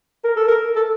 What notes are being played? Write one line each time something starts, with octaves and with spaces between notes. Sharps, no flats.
A#4
A4
A#4
A4